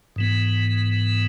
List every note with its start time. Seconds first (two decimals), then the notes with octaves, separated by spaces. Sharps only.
0.16 G#2 E3 B3